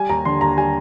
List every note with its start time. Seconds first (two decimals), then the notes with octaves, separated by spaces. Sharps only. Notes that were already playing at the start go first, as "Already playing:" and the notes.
Already playing: G3 G#5
0.09 D#2 A#5
0.25 D3 C6
0.41 D#2 A#5
0.57 G3 G#5